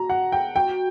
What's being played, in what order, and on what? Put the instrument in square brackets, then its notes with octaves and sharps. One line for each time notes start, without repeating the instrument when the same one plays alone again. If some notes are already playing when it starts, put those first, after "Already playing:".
Already playing: [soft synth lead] F#4 [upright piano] A#5
[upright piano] F#5
G5
[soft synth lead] F#4 [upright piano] G5